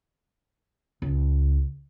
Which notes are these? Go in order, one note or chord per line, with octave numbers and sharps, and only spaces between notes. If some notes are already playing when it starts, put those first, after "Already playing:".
C#2